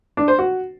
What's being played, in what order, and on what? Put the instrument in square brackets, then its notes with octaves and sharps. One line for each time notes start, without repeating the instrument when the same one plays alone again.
[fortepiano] D4
C5
F#4